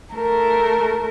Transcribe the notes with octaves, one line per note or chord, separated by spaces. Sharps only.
A3 A#4